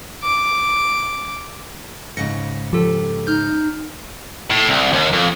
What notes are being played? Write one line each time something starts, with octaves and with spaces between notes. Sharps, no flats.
D6
G#2 C#3 A#6 C#7
F3 G4 A4
D#4 F6 G6
A2
C2
D#2
F2